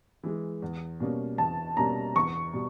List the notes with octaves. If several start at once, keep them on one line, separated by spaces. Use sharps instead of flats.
E3 G#3
E2
B2 G3 A#3 C#4
E2 A5
B2 G3 A#3 C#4 A#5
E2 C#6
B2 G3